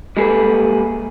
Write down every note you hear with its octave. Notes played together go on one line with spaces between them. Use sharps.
G3 G#3 A#3 G#4 A4 B4